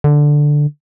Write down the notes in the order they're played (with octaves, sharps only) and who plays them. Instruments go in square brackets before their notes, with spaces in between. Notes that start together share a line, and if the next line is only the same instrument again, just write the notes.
[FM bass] D3